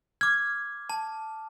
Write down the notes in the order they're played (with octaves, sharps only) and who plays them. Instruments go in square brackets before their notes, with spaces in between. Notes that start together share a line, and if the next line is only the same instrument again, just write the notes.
[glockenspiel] D6 F6 [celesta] G#6
[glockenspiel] A5